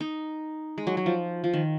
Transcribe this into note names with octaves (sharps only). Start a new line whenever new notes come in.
D#4
G#3
F#3
F#3
F3
F3
D#3